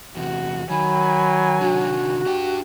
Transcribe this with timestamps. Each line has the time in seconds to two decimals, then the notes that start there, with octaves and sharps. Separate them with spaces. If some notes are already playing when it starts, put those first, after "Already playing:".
0.17 E2 C3 F#4
0.71 D#3 F#3 G#5 B5
1.61 C3 D#3 D4 F#4
2.26 D4 G4 G5